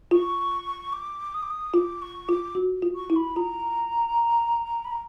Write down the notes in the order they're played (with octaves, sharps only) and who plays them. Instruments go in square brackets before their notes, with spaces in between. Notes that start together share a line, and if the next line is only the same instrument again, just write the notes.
[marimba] F4 [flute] C#6
[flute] D6
D#6
D6
D#6
[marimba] F4 [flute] D6
[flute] C#6
[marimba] F4 [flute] D6
[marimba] F#4
F4
[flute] C#6
[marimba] E4
[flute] B5
[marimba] F4 [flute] A#5
[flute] B5
A#5